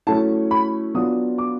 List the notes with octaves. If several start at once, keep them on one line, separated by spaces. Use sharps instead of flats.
F#3 A3 C#4 E4 A5
B5
F#3 B3 D4 F4 D#6
D6